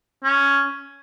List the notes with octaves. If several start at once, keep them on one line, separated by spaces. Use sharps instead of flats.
C#4